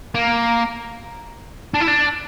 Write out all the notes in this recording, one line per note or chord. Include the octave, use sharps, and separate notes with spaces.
A#3
D4
E4
D4